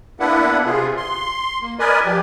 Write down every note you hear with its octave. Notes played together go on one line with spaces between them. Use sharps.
A#3 B3 D4 E4 B4 F#5
C3 F4 G#4
C6
A#3
A#4 B4 D5 D#5 G#5
F3 G4